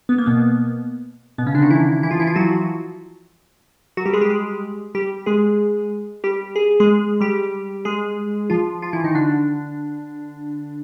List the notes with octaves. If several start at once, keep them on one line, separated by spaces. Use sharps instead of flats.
B3
A#3
B2 B3
B2 B3
C#3 C#4
D3 D4
D#3 D#4
E3 E4
E3 E4
F3 F4
E3 E4
F3 F4
F#3 F#4
F#3 F#4
G3 G4
G#3 G#4
G3 G4
G#3 G#4
G3 G4
G#3 G#4
G3 G4
G#4
G#3 G#4
G3 G4
G#3 G#4
F3 F4
F3 F4
E3 E4
D#3 D#4
D3 D4